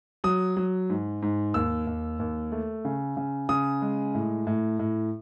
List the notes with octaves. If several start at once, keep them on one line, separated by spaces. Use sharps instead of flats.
F#3 D#6
F#3
G#2
G#2
D#2 E6
D#2
D#2
A3
C#3
C#3
C#3 D#6
G#3
A2
A2
A2